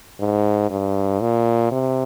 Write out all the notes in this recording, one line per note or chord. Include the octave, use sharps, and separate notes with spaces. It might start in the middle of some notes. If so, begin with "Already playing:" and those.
G#2
G2
A#2
C3